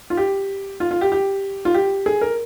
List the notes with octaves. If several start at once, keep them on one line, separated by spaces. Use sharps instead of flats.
F4
G4
F4
F4
G4
G4
F4
G4
G#4
A#4